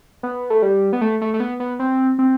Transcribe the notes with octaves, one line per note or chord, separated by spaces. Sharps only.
B3
A3
G3
B3
A3
A3
A3
B3
B3
C4
C4